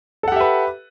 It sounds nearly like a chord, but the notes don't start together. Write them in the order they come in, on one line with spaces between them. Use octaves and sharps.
A4 F#5 G4 E5 B4